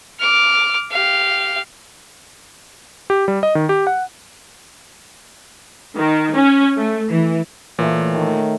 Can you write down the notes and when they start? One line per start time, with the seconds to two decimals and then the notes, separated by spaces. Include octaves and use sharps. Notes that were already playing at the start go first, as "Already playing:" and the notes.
0.20 D6 F6
0.91 G4 F5
3.10 G4
3.28 G3
3.43 D#5
3.55 D#3
3.69 G4
3.87 F#5
5.97 D#3
6.35 C#4
6.76 A3
7.09 E3
7.79 A#2 E3 A3 C#5
8.14 D#3 A3